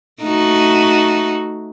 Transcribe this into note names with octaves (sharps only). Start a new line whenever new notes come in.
A3 D#4 F#4